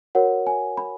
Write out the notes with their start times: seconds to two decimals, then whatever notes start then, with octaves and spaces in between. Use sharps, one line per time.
0.15 F#4 A#4 C#5 F#5
0.47 G#5
0.77 B5